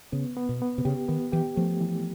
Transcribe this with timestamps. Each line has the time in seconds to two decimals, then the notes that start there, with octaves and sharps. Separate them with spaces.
0.12 C#3 B3
0.37 B3
0.49 B2
0.62 B3
0.78 C3
0.85 C#3 G4
1.08 D#3 B3
1.32 E3 G4
1.56 F3 A3
1.80 E3